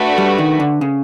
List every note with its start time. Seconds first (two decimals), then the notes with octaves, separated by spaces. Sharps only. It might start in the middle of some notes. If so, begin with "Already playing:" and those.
Already playing: A3 D4 F#4 B4
0.18 G3
0.38 D#3
0.60 D3
0.81 C#3